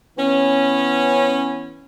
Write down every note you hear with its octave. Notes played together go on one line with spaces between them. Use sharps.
E3 B3 C#4